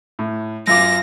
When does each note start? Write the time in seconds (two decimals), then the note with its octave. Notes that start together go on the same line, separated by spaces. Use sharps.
0.19 A2
0.67 F#2 F4 D6 A#6